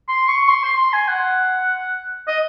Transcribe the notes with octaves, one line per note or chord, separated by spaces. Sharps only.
C6
C#6
C6
C6
C6
G#5
F#5
D#5